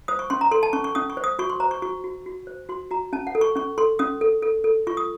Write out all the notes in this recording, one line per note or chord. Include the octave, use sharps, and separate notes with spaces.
C5 D#6
C#6
C#4 C6
A#5
A4 C6
A5
C#4 C#6
C#6
C#4 D#6
C#6
C5
D#6
F#4 C#6
C6
C5 A#5
C#6
F#4 C#6
F#4
F#4
C5
F#4 C6
F#4 A#5
C#4 A5
F#5
A4
C#6
C#4 C#6
A4 C6
C#4 D#6
A4
A4
A4
F4 C#6
D#6